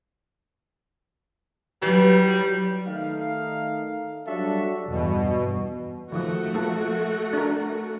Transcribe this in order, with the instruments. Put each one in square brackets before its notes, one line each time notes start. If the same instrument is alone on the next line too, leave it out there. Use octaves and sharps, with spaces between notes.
[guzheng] E3 [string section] F#3 [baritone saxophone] G3
[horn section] D#3 A3 D#4 F5
F#3 G3 D4 F#4 A4 E5
[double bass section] E2 G2 E3 [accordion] B2
[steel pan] D#3 F3 [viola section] A3 F#4
[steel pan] F3 A#3 A4
D4 A#4